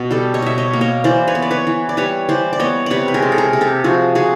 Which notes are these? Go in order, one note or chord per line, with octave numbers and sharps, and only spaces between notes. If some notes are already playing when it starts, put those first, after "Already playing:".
Already playing: B2
G3 G4 A4
C#5 D#5
B2 E5
C#5 D#5
A#3
C#5 D#5
E3 C5 D5
B4 C#5
B3
D5
B4 C#5
E3
D5
G3 B4 C#5
E3 C5 D5
D5
B3 C#5 D#5
C3 B4 C#5 D5
B4
G#4 A#4
G#3
A4
G#4 A#4
C3
G4 A4
F3 F#4 G#4
C3 F#4 G#4